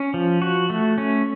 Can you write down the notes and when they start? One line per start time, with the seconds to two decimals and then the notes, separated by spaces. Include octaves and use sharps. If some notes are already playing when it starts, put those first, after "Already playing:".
Already playing: C#4
0.14 F3
0.42 F#4
0.70 A3
0.98 C#4